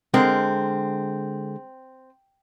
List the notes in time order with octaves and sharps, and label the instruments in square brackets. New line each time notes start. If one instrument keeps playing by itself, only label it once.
[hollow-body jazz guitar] D3 G#3 A#4 [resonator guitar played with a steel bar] C4